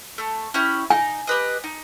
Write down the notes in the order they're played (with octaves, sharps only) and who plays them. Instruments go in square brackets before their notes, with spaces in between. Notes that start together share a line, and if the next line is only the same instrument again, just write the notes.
[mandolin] A3
C#4 E4 G4
[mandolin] D#4 [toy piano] G#5
[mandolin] G4 B4 D#5
D#4